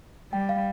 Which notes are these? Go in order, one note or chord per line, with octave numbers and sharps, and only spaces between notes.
G3 G5
F5